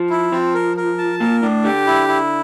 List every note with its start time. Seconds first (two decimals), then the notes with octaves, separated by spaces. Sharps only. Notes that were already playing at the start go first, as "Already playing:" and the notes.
Already playing: F3
0.10 E4
0.32 F3 C4
0.54 A#4
0.77 A#4
0.98 A5
1.20 A#2 A#4
1.42 A2 D4
1.64 D3 G4
1.87 E4
2.08 E4